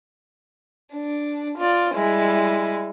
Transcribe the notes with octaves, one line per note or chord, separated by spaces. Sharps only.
D4
F4 D5
G3 G#3 E4